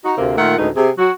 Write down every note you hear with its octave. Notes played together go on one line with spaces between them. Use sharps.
D#4 F#4
D2 C3 A#3
A#2 D#3 A3 F4 A#4 F#5
D2 A2 G#3 C#4 D#4 B4
C3 G#4
F#3 F#4